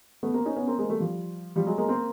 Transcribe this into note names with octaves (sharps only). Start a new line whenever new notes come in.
A3 B3
A#3 C4
C#4 D#4
B3 C#4
A#3 C4
G#3 A#3
G3 A3
F3 G3
F3 G3
F#3 G#3
G#3 A#3
A#3 C4